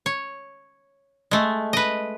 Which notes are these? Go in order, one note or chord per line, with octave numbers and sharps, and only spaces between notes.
C#5
G#3 A3
B4 D#5